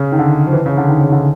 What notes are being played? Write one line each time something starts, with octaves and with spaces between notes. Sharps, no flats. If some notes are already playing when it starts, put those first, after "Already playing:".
Already playing: C#3
D#3
D3
F3
E3
C#3
D3
D#3
C#3
D3